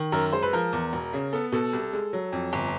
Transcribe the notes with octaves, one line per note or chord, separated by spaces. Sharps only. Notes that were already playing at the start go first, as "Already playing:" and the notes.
Already playing: D#3
F#2 A#4
G#3 C5
B4
F3 A#4
E2
E1
C#3
B3 A4
B2 A4
C2
G#3
F#3
F2
G1